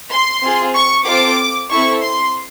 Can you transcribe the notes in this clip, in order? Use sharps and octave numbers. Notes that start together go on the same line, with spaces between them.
C6
C4 F4 G#4
C#6
C4 F4 A4 D6
C4 E4 A4 C#6
C6